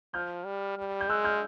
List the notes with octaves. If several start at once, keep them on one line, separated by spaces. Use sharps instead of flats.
F3 F6 G6
G3
G3
G6
G#3 E6 F#6
F6 G6